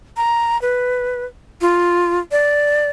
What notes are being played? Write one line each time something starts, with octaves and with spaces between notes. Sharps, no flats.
A#5
B4
F4
D5